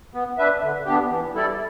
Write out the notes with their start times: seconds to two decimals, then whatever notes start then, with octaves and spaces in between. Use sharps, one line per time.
0.14 B3
0.38 D4 B4 E5
0.62 D3
0.86 B3 D4 G4
1.10 E3
1.33 G3 E4 A4 D5